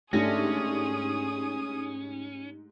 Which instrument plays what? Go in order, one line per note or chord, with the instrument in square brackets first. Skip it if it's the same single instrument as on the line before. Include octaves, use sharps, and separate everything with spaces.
[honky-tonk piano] G#2 G4 A#6 [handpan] A3 D4 [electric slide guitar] C#4 [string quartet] G#4 D#6